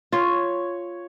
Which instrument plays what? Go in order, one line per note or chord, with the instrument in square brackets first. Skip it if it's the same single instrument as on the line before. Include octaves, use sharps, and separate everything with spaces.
[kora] F4 [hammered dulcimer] C#5